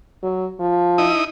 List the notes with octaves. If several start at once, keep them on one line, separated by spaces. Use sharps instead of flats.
F#3
F3
D#4 E4 D#6